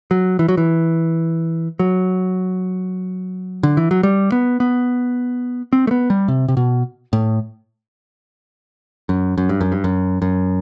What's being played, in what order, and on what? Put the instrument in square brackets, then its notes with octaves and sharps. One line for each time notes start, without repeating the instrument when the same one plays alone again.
[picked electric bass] F#3
E3
F#3
E3
F#3
D3
E3
F#3
G3
B3
B3
C4
A3
B3
G3
C3
C3
B2
A2
F#2
F#2
G2
F#2
G2
F#2
F#2